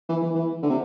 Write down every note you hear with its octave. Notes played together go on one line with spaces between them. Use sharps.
E3
E3
E3
D3
C3